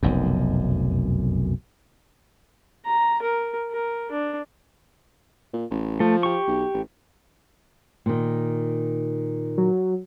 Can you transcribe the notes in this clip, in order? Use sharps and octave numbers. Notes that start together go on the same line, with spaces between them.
F1 B1 F#2
A#5
A#4
A#4
D4
A#2
A1
F3 A3
G4 C#6
B1
A1
A#2 D#3
F#3